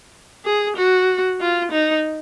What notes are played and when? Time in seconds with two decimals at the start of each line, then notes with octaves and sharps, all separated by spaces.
0.45 G#4
0.77 F#4
1.40 F4
1.71 D#4